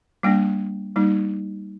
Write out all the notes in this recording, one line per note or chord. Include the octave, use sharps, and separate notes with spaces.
G3 A#3 D4 G5
G3 A#3 D#4